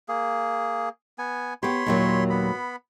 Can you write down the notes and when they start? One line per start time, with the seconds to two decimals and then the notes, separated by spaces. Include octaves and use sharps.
0.09 A#3 G#4
1.18 B3 G#5
1.63 B3 G4 C#5 B5 C6
1.86 D#2 A#2 F#3
2.30 B3 B5